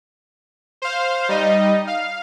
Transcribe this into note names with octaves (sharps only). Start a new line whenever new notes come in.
C5 F5
G3 D#4 D#5
F5